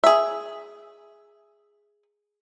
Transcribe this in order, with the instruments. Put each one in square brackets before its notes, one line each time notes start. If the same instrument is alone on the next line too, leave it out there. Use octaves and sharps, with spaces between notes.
[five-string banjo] G#4 E5